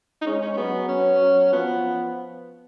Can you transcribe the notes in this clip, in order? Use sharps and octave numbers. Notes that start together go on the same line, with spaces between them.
D#4
G#3 C#4
C#4
C#4
F#3 B3
C#4
F#3
F3 B3